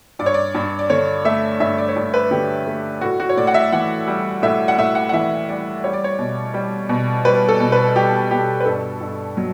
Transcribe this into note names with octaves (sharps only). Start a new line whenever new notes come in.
G2 D5
C#5
D5
G2
D5
D3 C#5
A3 E5
G2 E5
D5
C#5
G2 D5
B4
D3 G4
A3
A2 F#4
F#4
C#5
A2 D5
F#5
E5
E3 F#5
G3
A2 E5
F#5
A2 E5
F#5
F#5
E3 E5
G3 D5
G3 C#5
D5
C#5
B2
G3
B2
G3 B4
A4
B2
B4
G3 G4
B2 G4
B4
G2 A4
G2
F#3